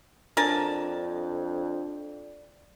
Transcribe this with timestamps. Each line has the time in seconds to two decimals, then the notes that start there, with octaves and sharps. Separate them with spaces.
0.37 F2 D4 A#4 D5 G#5 A5